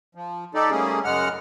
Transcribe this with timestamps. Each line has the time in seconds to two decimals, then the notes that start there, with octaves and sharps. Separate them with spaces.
0.15 F3
0.54 D#4 G4 A4 D5
0.70 G3 A3 A#3 C#4 G#4
1.04 F#2 C#3 G#3 F#5 F6